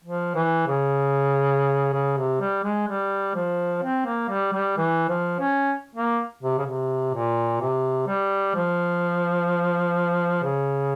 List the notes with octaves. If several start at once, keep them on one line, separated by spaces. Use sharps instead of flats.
F3
E3
C#3
C#3
C3
G3
G#3
G3
F3
C4
A#3
G3
G3
E3
F3
C#4
A#3
C3
C#3
C3
A#2
C3
G3
F3
C#3